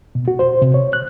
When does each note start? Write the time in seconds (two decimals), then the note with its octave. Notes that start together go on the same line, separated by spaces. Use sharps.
0.15 B2
0.28 F#4
0.39 C5
0.62 C3
0.74 C#5
0.93 F#6